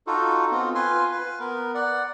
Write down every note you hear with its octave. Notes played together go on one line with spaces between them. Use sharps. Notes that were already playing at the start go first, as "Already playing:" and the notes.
D#4 F4 F#4 A4
B3 C4 F4
F4 B4 G#5 C6
B4
B3 A#4
D5 F#5